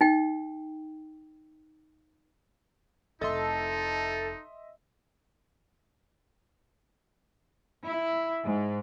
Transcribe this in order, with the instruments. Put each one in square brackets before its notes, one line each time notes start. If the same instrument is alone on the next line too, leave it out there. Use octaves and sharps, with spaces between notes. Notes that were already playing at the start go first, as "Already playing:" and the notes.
[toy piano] D#4 G5
[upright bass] F1 E4 [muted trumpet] D#4 [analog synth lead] A4 [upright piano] D#5 E5 C6
[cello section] E4
G#2